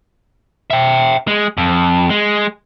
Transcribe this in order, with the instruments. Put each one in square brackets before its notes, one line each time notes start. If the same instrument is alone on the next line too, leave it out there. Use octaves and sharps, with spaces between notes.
[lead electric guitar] E5 G5
G#3
F2
G#3